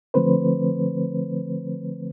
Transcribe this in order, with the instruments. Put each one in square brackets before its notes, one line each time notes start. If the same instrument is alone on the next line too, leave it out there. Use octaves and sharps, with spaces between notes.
[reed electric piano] D3 F3 A3 C4 B4 C5